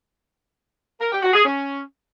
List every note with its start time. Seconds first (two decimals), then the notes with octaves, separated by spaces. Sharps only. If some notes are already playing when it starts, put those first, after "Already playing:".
1.00 A#4
1.11 G4
1.22 F#4
1.33 G#4
1.45 C#4